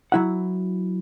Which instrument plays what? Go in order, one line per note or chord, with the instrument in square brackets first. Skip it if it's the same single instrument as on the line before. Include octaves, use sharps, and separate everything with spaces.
[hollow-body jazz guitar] F#3 E4 F#5